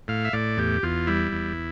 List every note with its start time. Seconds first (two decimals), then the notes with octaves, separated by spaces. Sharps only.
0.08 A2 F5
0.25 E5
0.33 A2 D5
0.57 E2 G4
0.83 E2 F4
1.07 G3 E4
1.32 E2